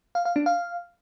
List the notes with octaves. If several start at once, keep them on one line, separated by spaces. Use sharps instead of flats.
F5
F5
D4
F5